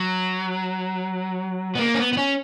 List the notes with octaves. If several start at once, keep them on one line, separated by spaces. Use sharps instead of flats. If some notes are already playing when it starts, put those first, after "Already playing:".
Already playing: F#3
B3
A#3
C#4
B3
B3
C#4